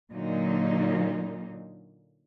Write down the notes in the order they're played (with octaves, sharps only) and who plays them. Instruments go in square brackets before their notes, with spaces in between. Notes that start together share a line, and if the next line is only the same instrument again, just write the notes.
[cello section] A#2 D3 F#3 A#3 D#4